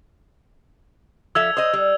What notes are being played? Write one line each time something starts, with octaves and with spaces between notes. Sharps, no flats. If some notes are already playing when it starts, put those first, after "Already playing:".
F3 A4 E5 E6 G#6 F7
C5 D#5 D#6
G3